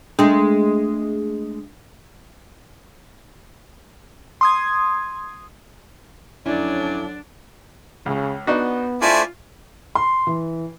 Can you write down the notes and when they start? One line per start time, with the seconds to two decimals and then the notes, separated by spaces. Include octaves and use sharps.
0.19 G#3 A3 D4
4.41 C6 D#6 G#6
6.46 F2 D3 F#3 C#4 D4 E4 D5
8.06 C#2 C#3
8.47 B3 D4 D#4 F#4
9.02 A3 D4 E4 F4 C5 D5 G#5
9.95 C6
10.27 E3